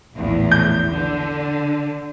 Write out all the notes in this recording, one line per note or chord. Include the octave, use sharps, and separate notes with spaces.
A#1 E2 A2
G6
D3